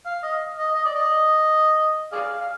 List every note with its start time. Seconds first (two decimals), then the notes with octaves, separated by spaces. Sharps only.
0.06 F5
0.23 D#5
0.58 D#5
0.75 D#5
0.85 D5
0.95 D#5
2.12 G#4 D5 F5
2.41 F5